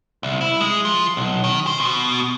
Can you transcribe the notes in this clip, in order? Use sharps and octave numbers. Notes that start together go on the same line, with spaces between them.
C2
E4
G#3
F3
B1
D#3
C5
B2